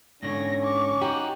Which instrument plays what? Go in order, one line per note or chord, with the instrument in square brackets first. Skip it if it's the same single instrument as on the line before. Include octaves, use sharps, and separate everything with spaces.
[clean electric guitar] G#2 D3 [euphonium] C#4 [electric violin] C#5 A#6
[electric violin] C#6 D6
[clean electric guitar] D#4 F#4 [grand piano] G4